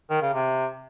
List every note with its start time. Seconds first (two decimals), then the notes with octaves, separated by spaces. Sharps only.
0.11 D#3
0.22 C#3
0.34 C3